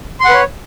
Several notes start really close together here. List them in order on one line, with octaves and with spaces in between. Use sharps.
C6 F#5 B4 C#5